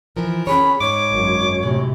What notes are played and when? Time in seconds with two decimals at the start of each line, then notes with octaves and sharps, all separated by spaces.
0.17 E3 F3 A#4
0.47 C#4 G#4 C#5 B5
0.80 G#2 C#5 D6
1.11 G#1 F#2
1.63 A2 C3 G#3